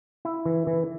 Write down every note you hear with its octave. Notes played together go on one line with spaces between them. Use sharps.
E4
E3
E3